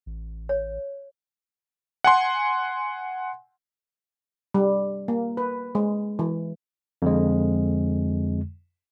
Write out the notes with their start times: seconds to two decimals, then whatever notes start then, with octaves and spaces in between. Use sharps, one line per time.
0.06 A1
0.49 C#5
2.04 F#5 G#5 C6
4.54 G3
5.08 A#3
5.37 B4
5.75 G#3
6.19 E3
7.02 F2 D3 G#3